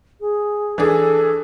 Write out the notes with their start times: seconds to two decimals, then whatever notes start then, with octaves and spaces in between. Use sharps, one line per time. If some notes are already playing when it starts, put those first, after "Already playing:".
0.21 G#4
0.78 E3 D4 G#4 A4